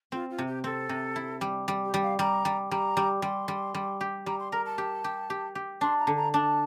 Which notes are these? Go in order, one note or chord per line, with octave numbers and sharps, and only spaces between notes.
C4 F4
F4
C3
G4
C4 A4
C3
E4
G3
G3
G4
G3
F5
G3 A#5
G3
G3 A#5
G3
G3 C6
G3
G3
G4
G3 A#5
C6
A#4 A#5
A5
G4
G4
G4
G4
D4 C6
A#5
D3
A#5
D4 A5